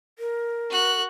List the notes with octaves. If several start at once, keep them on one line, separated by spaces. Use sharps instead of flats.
A#4
F#4 F#6